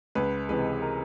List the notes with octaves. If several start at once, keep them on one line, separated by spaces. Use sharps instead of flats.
C#2 B4
C3 E3 G#3 B4
A#4